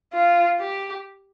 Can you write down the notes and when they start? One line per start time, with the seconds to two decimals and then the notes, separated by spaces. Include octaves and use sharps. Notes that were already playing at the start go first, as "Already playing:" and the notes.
0.14 F4
0.60 G4